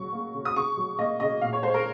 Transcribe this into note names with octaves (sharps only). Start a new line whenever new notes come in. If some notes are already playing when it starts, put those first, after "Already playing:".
Already playing: C#3 F#3 C#6
A#3
C#3
D#6
C#3 C#6
F#3
A#3 D#5
C#3 D#5
A#2 F5
C#5
G#3 C5
A#4